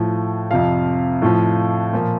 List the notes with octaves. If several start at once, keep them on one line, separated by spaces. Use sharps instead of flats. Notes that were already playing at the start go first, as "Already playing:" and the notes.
Already playing: A2 F3
F2 C3 F3 F5
A2 F3
A#2 F3